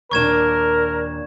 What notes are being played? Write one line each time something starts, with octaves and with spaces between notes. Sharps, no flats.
D#2 A#2 D4 A#4 C#6 G#6 E7